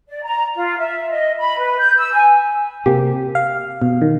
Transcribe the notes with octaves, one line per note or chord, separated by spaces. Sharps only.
D5
A#5
F4
E5
D#5
B5
B4
G6
E6
G#5
C3 A#3 G4
F5
B2
D#3